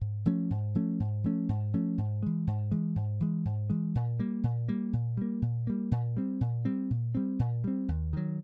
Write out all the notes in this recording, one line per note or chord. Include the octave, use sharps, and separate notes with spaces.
G#2
F3 A3 C#4
G#2
F3 A3 C#4
G#2
F3 A3 C#4
G#2
F3 A3 C#4
G#2
E3 G#3
G#2
E3 G#3
G#2
E3 G#3
G#2
E3 G#3
A#2
G3 A#3
A#2
G3 A#3
A#2
G3 A#3
A#2
G3 A#3
A#2
G3 C4
A#2
G3 C4
A#2
G3 C4
A#2
G3 C4
D#2
D#3 F#3